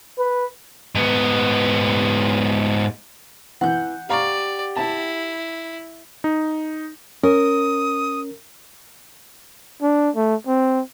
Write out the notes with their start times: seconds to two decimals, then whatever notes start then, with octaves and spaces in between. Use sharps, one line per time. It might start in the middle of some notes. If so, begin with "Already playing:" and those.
0.19 B4
0.95 G#2 B3
3.61 E3 F#5 G6
4.09 G4 D5 F5 A#5 C#6
4.76 E4 A5
6.24 D#4
7.23 C#4 A#4 D#6
9.82 D4
10.16 A3
10.47 C4